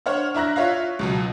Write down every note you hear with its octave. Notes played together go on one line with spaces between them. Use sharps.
D4 C5 C#5 F#5 F6
D4 E4 A#5 F#6 A#6
F4 C#5 E5 F5
C#2 B2 F#3